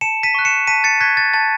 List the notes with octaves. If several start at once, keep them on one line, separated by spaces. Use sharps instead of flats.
A5 C#7 E7
B6 D#7
C#6 F#6
C#7 E7
A5 B6 D#7
A6 C#7
C#6 F#6 G#6 B6
A6
A5 A6